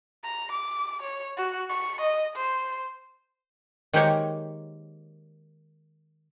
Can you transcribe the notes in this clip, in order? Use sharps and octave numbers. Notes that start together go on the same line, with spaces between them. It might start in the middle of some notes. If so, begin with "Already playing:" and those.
A#5
D6
C#5
F#4
C#6
D#5
C5
D#3 G#3 A#3 G4 C5 C#5